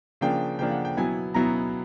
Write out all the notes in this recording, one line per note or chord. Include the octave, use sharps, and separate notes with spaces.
C#3 F3 A#3 D4 G5
C#3 F3 A#3 D4 G5
F#5
G5
B2 F#3 B3 E4 G#5
B2 F#3 B3 E4 A#5